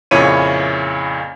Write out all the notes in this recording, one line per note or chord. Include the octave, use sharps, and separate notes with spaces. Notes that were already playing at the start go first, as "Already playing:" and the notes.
F2 A#2 C#3 E4 C#5 D#7